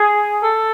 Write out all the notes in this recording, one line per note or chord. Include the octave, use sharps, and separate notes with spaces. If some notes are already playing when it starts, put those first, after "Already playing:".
Already playing: G#4
A4